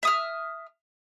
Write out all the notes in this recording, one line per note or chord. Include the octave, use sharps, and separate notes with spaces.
E5 D#6 F6